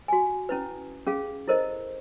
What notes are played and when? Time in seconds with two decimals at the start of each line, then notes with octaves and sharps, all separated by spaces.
0.08 F#4 G#5
0.49 C#4 E4 B4
1.07 C#4 G#4 F5
1.48 E4 A4 A#4 C5 D#5